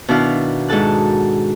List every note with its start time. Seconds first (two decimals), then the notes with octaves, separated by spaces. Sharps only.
0.08 B2 D#3 D4 E4 F5 F6
0.69 G#2 F#4 A4 A5 F#6